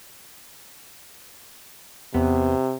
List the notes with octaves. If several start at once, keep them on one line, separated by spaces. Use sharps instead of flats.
E2 C3 B3